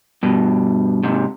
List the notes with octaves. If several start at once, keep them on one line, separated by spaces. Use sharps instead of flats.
G2 B2
G#2 C3